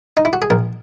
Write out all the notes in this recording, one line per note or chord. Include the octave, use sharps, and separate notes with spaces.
D#4
E4
F#4
G#4
A#1 A#4